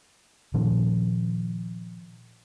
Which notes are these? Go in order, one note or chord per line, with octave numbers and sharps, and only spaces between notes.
A#2 D#3 F3 C#4